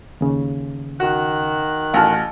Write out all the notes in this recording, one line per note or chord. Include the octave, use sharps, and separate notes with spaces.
D#2 C#3
D#3 F#4 F#6
A1 F#4 F5 G#5 A5 F6